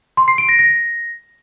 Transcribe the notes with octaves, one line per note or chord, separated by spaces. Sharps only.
C6
C7
D7
A#6
A#6